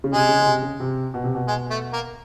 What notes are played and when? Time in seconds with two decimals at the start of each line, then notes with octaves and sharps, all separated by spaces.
0.04 C#3
0.12 C3 G#3
0.29 C#3
0.40 C#3
0.46 C3
0.62 C#3
0.80 C3
1.14 B2
1.24 C3
1.35 B2
1.48 G#3
1.70 A3
1.93 A#3